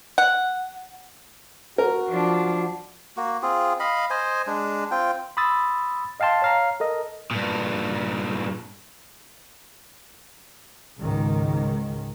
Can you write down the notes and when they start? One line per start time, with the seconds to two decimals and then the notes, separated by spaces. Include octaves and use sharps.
0.18 F#5
1.78 F#4 A#4
2.09 F3 D4
3.17 A#3 F#4
3.42 C4 F4 G#4
3.80 D#5 F5 B5
4.10 C5 D#5 G#5
4.47 G#3 D4
4.91 C4 F4 G5
5.37 B5 C6 D#6 E6 A6
6.20 D#5 F5 G5 A5 C6
6.42 C#5 F5 A#5
6.80 A4 A#4 D#5
7.31 G2 A#2
10.99 C#2 G#2 D#3